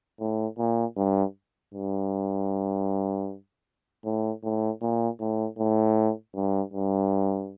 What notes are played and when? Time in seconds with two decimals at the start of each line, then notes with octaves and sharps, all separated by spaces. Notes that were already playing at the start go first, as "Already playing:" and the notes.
0.20 A2
0.58 A#2
0.97 G2
1.74 G2
4.05 A2
4.43 A2
4.82 A#2
5.20 A2
5.58 A2
6.35 G2
6.73 G2